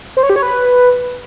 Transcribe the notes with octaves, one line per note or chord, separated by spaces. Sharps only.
C5
C#5
G4
C#5
B4